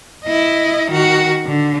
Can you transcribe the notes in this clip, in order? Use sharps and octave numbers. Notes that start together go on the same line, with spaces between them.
E4 D#5
D#3 F#4
D3